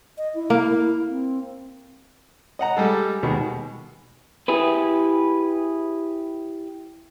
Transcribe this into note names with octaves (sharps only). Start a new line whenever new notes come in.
D#5
E4
A#3
C4
D#5 F#5 A#5
G3 G#3 A4
D#2 B2 D#3 G#3
E4 G4 G#4 B4